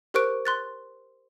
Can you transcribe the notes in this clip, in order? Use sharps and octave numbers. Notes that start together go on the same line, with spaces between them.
G4 A#4 C5 C#6 F#6 D7
C6 F#6 A6